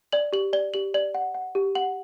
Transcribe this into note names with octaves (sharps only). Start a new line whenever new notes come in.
D5 F#7
G4 F#7
D5 G7
G4 F#7
D5 F#7
F#5
F#5
G4
F#5 F#7